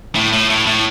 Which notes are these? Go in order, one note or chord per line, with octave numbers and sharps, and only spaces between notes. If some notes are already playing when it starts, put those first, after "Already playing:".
A2
A2
A2
A2